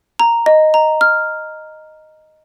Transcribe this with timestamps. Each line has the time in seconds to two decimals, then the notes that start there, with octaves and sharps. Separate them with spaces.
0.20 A#5
0.46 D#5
0.74 A#5
1.01 F6